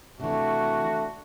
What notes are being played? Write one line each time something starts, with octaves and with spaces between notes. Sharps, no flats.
C3 E3 A3 D4 F#4